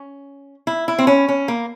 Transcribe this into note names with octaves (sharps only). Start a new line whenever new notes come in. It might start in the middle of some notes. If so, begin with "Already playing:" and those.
Already playing: C#4
E4
E4
C4
C#4
C#4
A#3